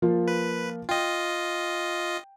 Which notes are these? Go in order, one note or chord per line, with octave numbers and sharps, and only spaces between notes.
F3 A#3 F4
B4
F4 D#5 G5